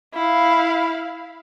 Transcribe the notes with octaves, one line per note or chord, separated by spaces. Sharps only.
E4 F5